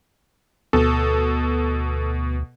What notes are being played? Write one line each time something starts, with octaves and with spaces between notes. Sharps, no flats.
D2 B2 A4